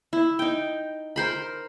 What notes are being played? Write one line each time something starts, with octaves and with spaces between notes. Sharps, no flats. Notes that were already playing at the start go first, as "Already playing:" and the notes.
E4
D#4 G5
A#4 C5 B5